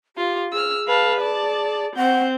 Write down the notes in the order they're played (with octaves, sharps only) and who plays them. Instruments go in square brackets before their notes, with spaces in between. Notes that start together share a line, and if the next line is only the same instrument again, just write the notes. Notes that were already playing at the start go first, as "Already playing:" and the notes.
[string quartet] F4 [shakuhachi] G4
[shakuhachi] G#4 [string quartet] E6 F6
[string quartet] B4 F5 A5
D5 A5
[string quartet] C4 G6 [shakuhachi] F#5